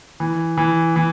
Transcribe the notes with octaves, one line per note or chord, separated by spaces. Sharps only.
E3
E3
E3